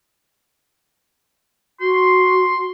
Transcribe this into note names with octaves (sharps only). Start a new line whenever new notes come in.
F#4 C6